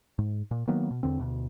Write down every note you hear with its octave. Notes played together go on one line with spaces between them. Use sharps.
G#2
A#2
D#3 F#3 A#3 B3
B2
E2 D3 C4
D2 B2